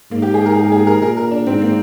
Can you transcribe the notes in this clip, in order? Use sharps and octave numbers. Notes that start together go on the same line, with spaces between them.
G#2 A#3
G4
G#4
A#4
G#4
G#4
A#4
A#2 A#4
A#4
D4
G#2 C4
A#3